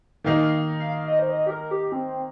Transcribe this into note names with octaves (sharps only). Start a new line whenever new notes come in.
D#3 A#3 D#4 F5
F5
D#5
C5
D#5
G4
A#4
G4
C4